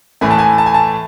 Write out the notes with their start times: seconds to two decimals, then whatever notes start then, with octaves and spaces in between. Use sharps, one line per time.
0.21 A2 E3 A3 G#5
0.31 A5
0.38 G#5
0.58 A5
0.66 G#5
0.74 A5